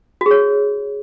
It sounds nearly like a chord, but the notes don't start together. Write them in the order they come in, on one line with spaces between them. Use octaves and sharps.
F#4 G#4 C#5